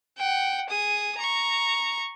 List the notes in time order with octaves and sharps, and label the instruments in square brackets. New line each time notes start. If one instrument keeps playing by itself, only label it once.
[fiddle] F#5 G5
G#4 D#6
A#5 C#6